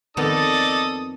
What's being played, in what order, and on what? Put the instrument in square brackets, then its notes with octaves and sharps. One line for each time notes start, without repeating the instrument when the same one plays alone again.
[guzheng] F2 D#3 B3 [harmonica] D#4 A4 D5 [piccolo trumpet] D#6